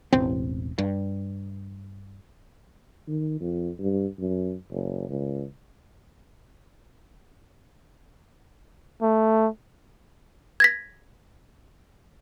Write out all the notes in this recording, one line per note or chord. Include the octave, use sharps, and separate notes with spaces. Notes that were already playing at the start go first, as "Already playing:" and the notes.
E1 A1 C4
G2
D#3
F2
G2
F#2
F#1
C#2
A3
G#6 A#6 B6